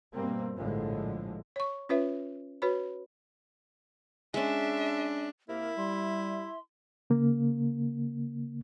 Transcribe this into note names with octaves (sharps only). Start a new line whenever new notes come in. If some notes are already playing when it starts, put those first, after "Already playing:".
G2 B2 G3 A#3 C4
A#1 A2 D3 F3 G#3
C#5 C#6
C#4 F4 B4 C#5 E5
F#4 B4 C#5 B5
G#3 C#4 D4 E5
C3 A#3 E4 A#4 E5
G3 C6
C#3 A#3